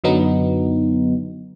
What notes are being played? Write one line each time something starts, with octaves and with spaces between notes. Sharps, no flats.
F#2 D3 F#3 B3 D#4